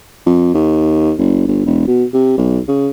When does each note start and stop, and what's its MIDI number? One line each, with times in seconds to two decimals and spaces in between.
0.26 0.51 41
0.54 1.13 39
1.18 1.46 30
1.47 1.64 31
1.65 1.87 28
1.87 2.04 47
2.13 2.35 48
2.38 2.59 35
2.68 2.90 49